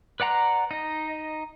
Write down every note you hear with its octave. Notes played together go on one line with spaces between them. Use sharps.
B4 D5 F#5 A#5 C6
D#4 D#5